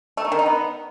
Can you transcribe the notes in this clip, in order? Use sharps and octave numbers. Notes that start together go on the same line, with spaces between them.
A3
D#4
D#3
D#4
B3